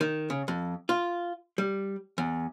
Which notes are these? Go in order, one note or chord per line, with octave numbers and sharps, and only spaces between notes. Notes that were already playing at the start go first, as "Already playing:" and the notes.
D#3
C#3
F2
F4
G3
E2